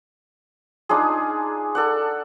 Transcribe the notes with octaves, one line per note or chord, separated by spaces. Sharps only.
D4 D#4 F4 G#4
A4 D5 F#5